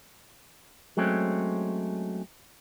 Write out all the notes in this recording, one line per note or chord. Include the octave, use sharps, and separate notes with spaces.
F#3 G#3 A3 C4 C#4